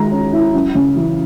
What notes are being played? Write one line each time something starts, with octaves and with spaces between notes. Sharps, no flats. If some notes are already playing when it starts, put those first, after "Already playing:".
Already playing: D#3 G#3 A#5
C#4
E4
F#2
C#3
E3